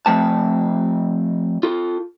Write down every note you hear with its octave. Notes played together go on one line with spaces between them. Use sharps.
F3 A3 C4 A5
F4 A4